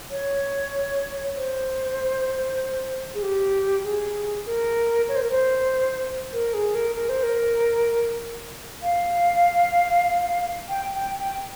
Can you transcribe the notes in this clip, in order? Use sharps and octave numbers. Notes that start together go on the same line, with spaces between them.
C#5
C5
G#4
G4
G#4
A#4
C#5
C5
A#4
C5
A#4
G#4
A#4
A#4
C5
A#4
F5
G5
G5
G5